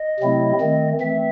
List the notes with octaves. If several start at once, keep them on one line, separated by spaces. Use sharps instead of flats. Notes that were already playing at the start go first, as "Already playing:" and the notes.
Already playing: D#5
C3 F#3 A3 C4 E4
D#3 A3 C4
E3 A3 C4 E5